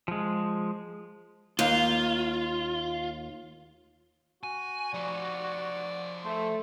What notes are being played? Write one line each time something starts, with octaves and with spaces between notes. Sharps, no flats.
F3 G#3
D#2 F4
F#4 G#5
F3 G4 D5
A3 C5